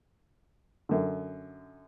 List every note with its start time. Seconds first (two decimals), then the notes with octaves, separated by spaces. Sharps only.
0.89 F#2 D3